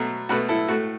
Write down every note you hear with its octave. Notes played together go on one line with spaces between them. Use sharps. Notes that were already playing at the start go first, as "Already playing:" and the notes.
Already playing: B2 F#3 A3
B2 A3 F#4 B4
E4 A4
A2 A3 F#4